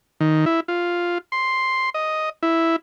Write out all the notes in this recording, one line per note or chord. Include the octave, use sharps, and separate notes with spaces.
D#3
E4
F4
C6
D#5
E4